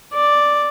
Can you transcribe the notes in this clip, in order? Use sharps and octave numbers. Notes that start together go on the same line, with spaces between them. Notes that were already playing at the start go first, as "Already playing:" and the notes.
D5